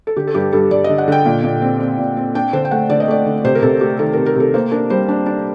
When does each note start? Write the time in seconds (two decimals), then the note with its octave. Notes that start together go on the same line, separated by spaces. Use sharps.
0.07 A4
0.17 D3 G4
0.27 A4
0.34 G2 G4
0.52 G2 A4
0.71 G2 D5
0.84 D#5
0.89 D3
0.98 F#5
1.08 D3 G5
1.25 A#2
1.44 A#2
1.62 C4
1.80 C4
1.98 A#2
2.17 C4
2.35 D4 G5
2.53 D3 C5
2.65 G5
2.71 A3 F#5
2.90 D3 D5
3.00 D#5
3.08 A3 D5
3.26 D3
3.44 C3 C5
3.55 A#4
3.62 C3 A4
3.81 A3 G4
3.99 D#3 A4
4.13 C3 A#4
4.26 A#4
4.35 C3 A4
4.54 A#3 C5
4.72 D4 A#4
4.90 G3 C5
5.08 D4
5.26 D4